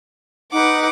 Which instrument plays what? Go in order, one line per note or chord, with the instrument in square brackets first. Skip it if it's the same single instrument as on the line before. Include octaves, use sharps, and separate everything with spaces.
[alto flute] D#4 [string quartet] B4 F#5 D6